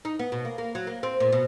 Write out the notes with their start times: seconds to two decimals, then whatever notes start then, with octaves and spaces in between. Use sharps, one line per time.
0.05 D#4
0.19 B3
0.32 B2
0.45 A#3
0.58 A#3
0.75 F#3
0.87 A#3
1.03 C4
1.20 A#2
1.32 B2